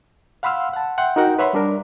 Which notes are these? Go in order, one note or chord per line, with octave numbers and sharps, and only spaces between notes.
F5 F#5 B5 C6 E6 F6
F#5 A5
E5 F#5 G5 C6
D#4 F#4 A#4 F#5 G5
B4 C#5 E5 F#5 B5 C6
G3 D4 A#4